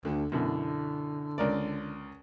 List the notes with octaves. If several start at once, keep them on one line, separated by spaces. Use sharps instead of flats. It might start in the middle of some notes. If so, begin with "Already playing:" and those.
D2 D3
F#2 B2 D3 E3
C#2 A#4 D5